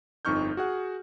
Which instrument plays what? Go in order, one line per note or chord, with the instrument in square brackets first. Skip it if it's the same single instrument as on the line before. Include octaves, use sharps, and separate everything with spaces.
[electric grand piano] G1 F2 D#4 C#6 F6 G6
F#4 G#4 F#5